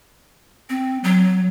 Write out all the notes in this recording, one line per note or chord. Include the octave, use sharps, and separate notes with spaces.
C4
F#3